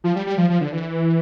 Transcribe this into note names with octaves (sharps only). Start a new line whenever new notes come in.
F3
G3
G3
F3
F3
D3
E3